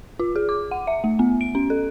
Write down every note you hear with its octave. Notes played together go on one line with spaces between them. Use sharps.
F4
G#4
D6
F#5
E5
A3
B3
D7
C#4
A4